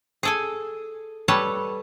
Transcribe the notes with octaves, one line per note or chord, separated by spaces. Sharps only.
G#4 A4 G#5
G3 A4 B4 C#5 A5